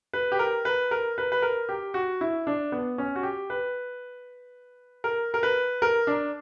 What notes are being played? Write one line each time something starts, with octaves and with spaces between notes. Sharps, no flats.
B4
G4
A#4
B4
A#4
B4
B4
A#4
G4
F#4
E4
D4
B3
C#4
F#4
G4
B4
A#4
A#4
B4
A#4
D4